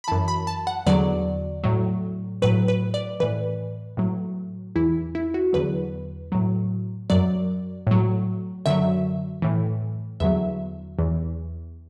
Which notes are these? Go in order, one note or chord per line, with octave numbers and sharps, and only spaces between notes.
B5
F#2 E3 A5
B5
A5
F#5
E2 D3 F#3 D5
A2 F#3
A2 F#3 B4
B4
D5
A2 E3 B4
A2 F#3
E2 E3 E4
E4
F#4
E2 D3 F#3 B4
A2 F#3
F#2 F#3 D5
A2 F#3
F#2 D3 F#3 E5
A2 E3
E2 D3 F#3 E5
E2 E3